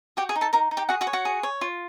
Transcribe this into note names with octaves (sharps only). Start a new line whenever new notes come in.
F#4 G4 G5
G#4 G#5
D#4
A4 A5
D#4 A#4 A#5
D#4
G4 G5
F#4 G#4 F#5
F#4 F#5
C#5
F#4 F#5
G#4
C#5
F4